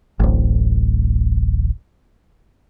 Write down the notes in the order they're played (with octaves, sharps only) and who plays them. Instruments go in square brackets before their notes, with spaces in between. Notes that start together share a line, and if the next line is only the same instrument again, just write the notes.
[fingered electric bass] D1 A1